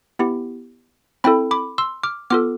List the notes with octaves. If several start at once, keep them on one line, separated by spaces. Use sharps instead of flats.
B3 E4 G4
C4 E4 A4 G5 B5
B5 D6
C6 E6
D6 F6
B3 F4 A4 D6 F6